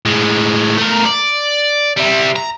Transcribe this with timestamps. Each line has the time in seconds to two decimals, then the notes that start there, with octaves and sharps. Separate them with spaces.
0.05 A2 G#3
0.77 A3 A#4
1.05 D5
1.97 G3 E4
2.36 A#5